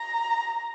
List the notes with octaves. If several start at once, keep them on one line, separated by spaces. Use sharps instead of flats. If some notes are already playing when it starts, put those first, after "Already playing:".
Already playing: A#5